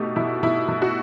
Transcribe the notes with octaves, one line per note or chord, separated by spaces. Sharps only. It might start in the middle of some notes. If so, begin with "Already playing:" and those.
Already playing: B2 A3 D#4 G4
B2 E4
B2 E4
B2
F#4